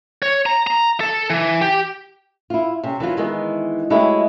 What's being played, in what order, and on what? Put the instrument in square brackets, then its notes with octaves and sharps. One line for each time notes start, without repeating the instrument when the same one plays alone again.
[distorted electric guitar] C#5
A#5
A#5
A4
E3
G4
[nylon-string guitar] E4 F4
C3 C#4
E3 F#3 F4
D#3 E3 G#3 B3
F#3 G#3 A3 E4 G4 C#5